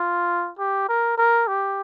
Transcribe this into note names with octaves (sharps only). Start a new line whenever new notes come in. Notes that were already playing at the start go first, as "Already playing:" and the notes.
Already playing: F4
G4
A#4
A#4
G4